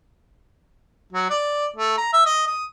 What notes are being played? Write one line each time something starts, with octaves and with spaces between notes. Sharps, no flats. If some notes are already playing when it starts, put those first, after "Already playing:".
F#3
D5
A3
A#5
E5
D#5
D#6